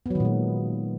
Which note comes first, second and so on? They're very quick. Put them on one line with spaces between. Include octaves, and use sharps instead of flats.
B3 F#3 D#3 A#2 G#3